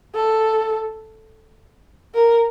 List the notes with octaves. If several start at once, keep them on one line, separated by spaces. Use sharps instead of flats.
A4
A#4